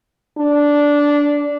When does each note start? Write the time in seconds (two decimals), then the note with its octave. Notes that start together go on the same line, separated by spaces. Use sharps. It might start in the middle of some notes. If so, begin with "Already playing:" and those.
0.38 D4